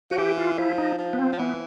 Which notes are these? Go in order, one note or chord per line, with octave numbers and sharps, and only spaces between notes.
F3 F#4
E3 G4
F4
F3 E4
D#4
F3
B3
C4
F3
E3 B3